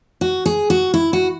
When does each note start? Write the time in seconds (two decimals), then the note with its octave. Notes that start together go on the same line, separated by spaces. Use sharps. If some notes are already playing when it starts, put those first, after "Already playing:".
0.21 F#4
0.46 G#4
0.70 F#4
0.94 E4
1.13 F#4